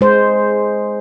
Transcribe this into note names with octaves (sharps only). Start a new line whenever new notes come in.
G#3 C5